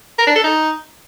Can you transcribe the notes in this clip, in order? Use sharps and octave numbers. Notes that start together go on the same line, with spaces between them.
A#4
D4
A4
D#4